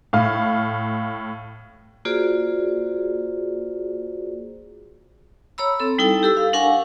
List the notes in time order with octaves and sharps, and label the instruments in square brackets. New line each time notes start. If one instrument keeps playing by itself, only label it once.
[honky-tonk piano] A2 F5
[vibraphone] A#3 F4 F#4 G#4 C5 D5
C#5 A#5 B5 E6
C4 A4
G3 D#4 E4 A4 G5
G4 A4 E6
F5
D4 A#4 F5 F#5 G#5 C#6